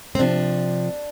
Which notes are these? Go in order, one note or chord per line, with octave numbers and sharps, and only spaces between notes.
C4
C3 F3 D4